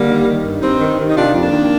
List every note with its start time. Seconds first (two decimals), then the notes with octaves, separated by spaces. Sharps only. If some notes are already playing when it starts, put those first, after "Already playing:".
Already playing: D3 G3 A#3
0.08 D#3
0.26 D#3
0.45 G2
0.61 G2 C4 D#4
0.80 D#3
0.98 D#3
1.09 D#4
1.15 C3 D4 F4
1.34 F2
1.43 A#3 D4
1.52 D#3